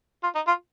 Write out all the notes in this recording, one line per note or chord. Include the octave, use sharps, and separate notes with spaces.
F4
D#4
F4